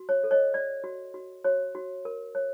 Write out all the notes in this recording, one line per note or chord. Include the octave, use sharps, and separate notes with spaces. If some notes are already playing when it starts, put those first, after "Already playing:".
Already playing: F#4
C#5
A4
C#5 D#5
C#5 D5
F#4
F#4
F#4 C#5
F#4
A#4
C#5